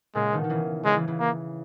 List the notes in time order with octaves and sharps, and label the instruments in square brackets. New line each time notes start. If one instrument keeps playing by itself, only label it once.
[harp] A#2 C#3 [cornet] G#3
[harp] B2 D#3
D#3
C#3 E3
[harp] C#3 E3 [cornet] G#3
[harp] C#3 E3
C#3 E3
[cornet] A#3